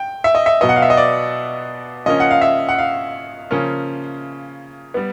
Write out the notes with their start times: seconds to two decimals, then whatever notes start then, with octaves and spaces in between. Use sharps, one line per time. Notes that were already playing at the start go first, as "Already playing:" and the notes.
Already playing: G5
0.24 E5
0.35 D#5
0.46 E5
0.61 B2 F#3 B3 D#5
0.69 F#5
0.76 F5
0.82 E5
0.90 D#5
0.97 D5
2.06 C#3 F3 A#3 C#4 D#5
2.20 F#5
2.31 F5
2.41 E5
2.69 F#5
2.78 F5
3.51 C#3 F3 A#3 C#4
4.94 G3 B3